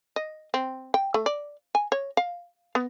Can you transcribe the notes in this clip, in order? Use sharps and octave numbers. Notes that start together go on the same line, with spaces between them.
D#5
C4
G5
A3
D5
G#5
C#5
F5
B3